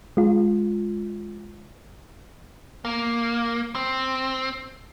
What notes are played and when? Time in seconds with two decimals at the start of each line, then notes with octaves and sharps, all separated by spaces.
0.17 G#3 F4
2.85 A#3
3.75 C4